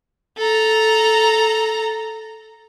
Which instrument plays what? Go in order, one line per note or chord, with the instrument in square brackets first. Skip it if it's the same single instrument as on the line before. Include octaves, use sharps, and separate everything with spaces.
[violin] A4 A#5